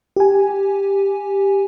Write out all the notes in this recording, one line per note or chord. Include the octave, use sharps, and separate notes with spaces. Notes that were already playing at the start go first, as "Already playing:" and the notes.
G4 G#5